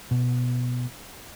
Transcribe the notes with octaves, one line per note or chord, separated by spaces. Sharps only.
B2